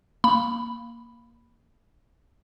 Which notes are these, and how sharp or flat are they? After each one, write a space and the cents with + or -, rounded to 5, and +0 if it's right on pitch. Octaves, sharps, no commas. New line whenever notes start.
A#3 +0 B5 +0